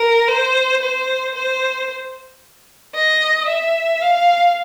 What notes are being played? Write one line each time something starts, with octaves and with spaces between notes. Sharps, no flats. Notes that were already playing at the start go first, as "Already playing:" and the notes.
Already playing: A#4
C5
C5
C5
D#5
E5
F5